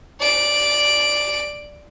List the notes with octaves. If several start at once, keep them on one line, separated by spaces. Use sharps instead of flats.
D5 D7